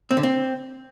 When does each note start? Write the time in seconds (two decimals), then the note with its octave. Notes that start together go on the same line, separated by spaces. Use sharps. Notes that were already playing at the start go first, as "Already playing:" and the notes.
0.11 C4
0.17 D3
0.23 C4